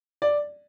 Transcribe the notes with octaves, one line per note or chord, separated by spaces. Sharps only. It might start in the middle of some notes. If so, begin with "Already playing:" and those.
D5